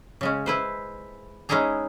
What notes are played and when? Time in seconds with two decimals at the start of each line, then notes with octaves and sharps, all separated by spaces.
0.21 C#3 G#3 C#4
0.46 E4 B4 C5
1.49 G#3 C#4 D#4 E4 G#4 A#5